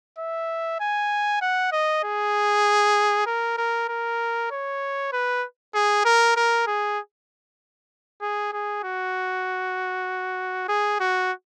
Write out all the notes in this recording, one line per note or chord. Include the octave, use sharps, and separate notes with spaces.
E5
G#5
F#5
D#5
G#4
A#4
A#4
A#4
C#5
B4
G#4
A#4
A#4
G#4
G#4
G#4
F#4
G#4
F#4